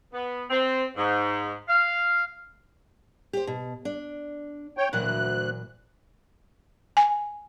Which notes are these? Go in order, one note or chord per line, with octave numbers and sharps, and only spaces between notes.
B3
C4
G#2
F5
G4 C5
B2
D4
C#5 G5
D2 A#2 E3 F#3 F#6
G#5